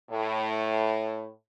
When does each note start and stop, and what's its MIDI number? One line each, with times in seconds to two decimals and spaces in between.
0.10 1.29 45